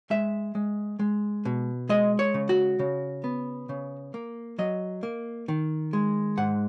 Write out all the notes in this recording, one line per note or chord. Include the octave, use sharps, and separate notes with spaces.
G#3 E5
G#3
G#3
B2
G#3 D#5
C#5
C#3
F#4
C#3
B3
C#3
A#3
F#3 D#5
A#3
D#3
G#3
G#2 F#5